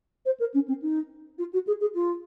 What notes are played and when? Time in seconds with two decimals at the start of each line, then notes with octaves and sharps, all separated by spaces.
0.25 C5
0.40 A#4
0.54 C#4
0.68 C4
0.82 D#4
1.38 F4
1.53 F#4
1.67 G#4
1.81 G#4
1.95 F4